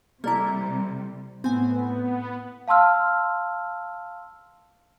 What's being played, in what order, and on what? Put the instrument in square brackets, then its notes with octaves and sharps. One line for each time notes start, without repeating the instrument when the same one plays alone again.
[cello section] C3 G3 [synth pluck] A#3 E4 [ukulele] A4 D5 A#5
[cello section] A2 [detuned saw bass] B3 [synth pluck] C4 G#5
[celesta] F5 A5 C6 E6 F6